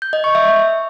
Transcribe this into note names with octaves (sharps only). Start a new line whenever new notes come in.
G6
D#5
C#6
E5